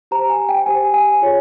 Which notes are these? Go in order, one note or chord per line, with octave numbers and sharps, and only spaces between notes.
G4 C5 A#5
G#5
G5
G4 C5 G#5
G#5
F4 G#4 C#5